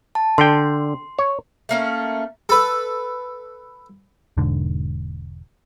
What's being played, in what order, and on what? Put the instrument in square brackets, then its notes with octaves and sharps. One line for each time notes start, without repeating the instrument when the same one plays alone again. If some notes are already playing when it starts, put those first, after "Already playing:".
[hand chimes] A5
[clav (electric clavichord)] D3 G5 [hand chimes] C6
[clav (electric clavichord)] C#5
[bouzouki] A3 A#3 C#4
[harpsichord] A4 B4
[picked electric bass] E1 G#2 D3